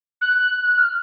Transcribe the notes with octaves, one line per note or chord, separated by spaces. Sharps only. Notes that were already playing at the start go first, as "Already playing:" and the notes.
F#6
F6